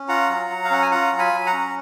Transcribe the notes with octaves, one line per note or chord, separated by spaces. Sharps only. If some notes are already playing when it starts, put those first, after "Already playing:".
Already playing: C#4
F4 F#5 A#5
F#3
F#3
F5
C#4 F#5
G#5
F4 F#5 A#5
F#3
G#5 B5
F#3
F#5 A#5
C#4